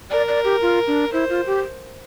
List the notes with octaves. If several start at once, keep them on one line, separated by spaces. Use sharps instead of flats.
A#4 D5
D5
G4
F4
D4
E4 C5
F4
G4